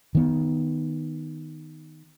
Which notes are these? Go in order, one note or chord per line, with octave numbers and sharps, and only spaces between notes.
D#3 B3